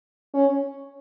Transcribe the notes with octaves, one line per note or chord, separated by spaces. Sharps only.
C#4